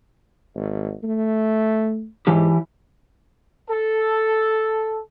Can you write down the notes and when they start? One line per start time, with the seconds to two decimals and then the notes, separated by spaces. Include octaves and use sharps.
0.55 G#1
1.04 A3
2.27 G#2 E3 E4 G4
3.70 A4